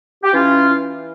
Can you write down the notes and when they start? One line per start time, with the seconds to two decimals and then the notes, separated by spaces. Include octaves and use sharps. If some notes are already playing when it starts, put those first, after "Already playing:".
0.23 G4
0.32 E3 C#4 F4
0.70 E3